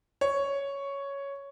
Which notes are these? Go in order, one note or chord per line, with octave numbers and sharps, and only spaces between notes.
C#5